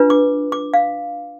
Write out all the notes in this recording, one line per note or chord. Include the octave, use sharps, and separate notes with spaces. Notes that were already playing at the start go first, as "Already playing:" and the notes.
Already playing: D4 F4 B4
D6
D6
F5